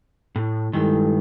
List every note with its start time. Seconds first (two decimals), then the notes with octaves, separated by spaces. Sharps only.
0.36 A2
0.73 G2 D#3 G#3 E4 A4